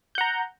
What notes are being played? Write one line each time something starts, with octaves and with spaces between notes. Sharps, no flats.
F#5 A#5 G6